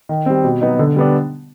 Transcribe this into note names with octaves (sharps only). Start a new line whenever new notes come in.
D#3
G3 C4
B2
F#3 B3 D#4
D3
G3 B3 D4